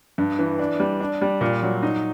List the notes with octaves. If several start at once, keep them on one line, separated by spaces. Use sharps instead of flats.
G2
E3
D4
G3
D4
G3
A#2
F#3
D#4